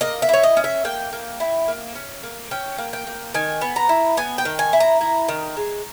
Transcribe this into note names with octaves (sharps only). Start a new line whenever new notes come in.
A#3 D#5
E5
E4 C#5
D#5
C#4
E5
A#3 G5
A#3
E4
A#3
C#4
A#3
C#4 G5
A#3
G5
A#3
D#3 G#5
B3
A#5
E4
B3 G#5
G5
D#3
G#5
E4
A#5
E4
D#3
G#3